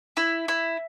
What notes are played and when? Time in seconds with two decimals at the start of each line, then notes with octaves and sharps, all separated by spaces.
0.17 E4
0.48 E4